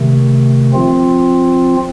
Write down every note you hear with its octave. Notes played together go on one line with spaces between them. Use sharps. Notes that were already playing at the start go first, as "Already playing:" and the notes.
Already playing: C3 D#3 A3
F3 C4 F4